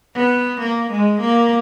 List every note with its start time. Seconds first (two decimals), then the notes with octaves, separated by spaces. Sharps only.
0.14 B3
0.60 A#3
0.91 G#3
1.21 A#3